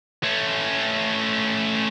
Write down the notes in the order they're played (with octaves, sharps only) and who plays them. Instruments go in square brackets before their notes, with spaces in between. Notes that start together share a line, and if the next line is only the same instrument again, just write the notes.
[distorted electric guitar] A3 C#4